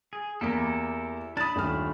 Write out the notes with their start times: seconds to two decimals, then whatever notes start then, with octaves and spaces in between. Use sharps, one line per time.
0.13 G#4
0.41 E2 A#3 E4 G4 A4
1.37 D4 A5 B5 D#6 A6
1.56 D#1 A3 F6